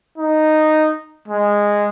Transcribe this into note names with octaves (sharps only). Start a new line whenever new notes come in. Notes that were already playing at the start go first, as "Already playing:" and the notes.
D#4
G#3